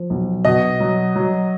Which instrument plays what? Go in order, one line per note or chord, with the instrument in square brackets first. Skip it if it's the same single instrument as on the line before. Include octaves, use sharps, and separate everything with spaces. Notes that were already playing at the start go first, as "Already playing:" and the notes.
Already playing: [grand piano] F3
B1
[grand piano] B2 [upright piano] D#5
[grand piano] F#3
F#3